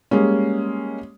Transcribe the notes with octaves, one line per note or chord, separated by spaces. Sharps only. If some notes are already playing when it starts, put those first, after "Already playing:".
G3 G#3 A#3 C#4